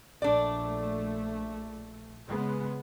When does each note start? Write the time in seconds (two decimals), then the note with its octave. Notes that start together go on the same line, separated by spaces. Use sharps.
0.22 A#1 A3 D4 D5
2.28 C#3 G#3 B3